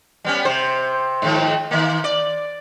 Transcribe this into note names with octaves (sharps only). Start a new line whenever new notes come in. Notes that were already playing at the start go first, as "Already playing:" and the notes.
G3 B3 C#4
C3 C5
G#2 D#3 F3
D#3 A#3
D5